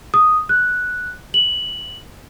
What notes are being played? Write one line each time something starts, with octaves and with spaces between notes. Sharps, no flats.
D#6
F#6
F#7